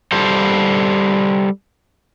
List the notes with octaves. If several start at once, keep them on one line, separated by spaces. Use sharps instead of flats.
G3 A4 C5